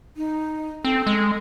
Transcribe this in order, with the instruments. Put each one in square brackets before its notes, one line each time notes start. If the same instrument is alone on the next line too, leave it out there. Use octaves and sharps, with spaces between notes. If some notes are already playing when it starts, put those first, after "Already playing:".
[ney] D#4
[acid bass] C4 [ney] A4
[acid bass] G#3